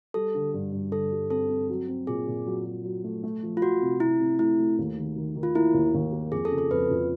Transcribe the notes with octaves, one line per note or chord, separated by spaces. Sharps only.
G3 A4
D3
G2
G2
D3 A4
G3
C4 A4
C4
F#3
C4
A#2 G#4
A#2
F#3
F#3
F#3
A3
A3
F3
F4
A3 F#4
C3
C3 E4
C3
A3 E4
A3
D#2
D#3
D#3
D#3
F4
A#3 E4
D#2
D#2
A#3
F2 G#4
A4
C#3
A4
F2 B4
F2